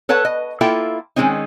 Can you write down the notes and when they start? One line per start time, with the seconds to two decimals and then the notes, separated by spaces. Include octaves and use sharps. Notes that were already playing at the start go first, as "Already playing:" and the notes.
0.09 A4 B4 C#5 F#5 A5
0.25 D#5
0.61 A#3 E4 F4 A4 E5 G5
1.16 D#3 F3 G#3 C4 C#4 D#4